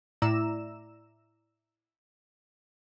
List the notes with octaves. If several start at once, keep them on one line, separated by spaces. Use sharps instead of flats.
A2 E4 D5 A#5 E6 E7